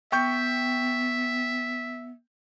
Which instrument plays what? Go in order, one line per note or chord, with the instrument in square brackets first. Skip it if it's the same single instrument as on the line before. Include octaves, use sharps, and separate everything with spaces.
[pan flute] B3 [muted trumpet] E5 [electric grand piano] G5 C#6 G6